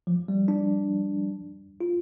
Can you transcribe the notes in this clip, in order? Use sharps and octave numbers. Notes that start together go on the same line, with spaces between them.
F3
G3
D4
F4